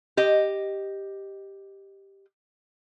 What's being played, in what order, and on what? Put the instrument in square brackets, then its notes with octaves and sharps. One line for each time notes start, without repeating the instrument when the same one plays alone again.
[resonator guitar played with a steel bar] G4 D#5